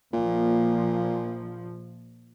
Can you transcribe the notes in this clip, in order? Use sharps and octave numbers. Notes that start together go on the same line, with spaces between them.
A#1 A#2 F3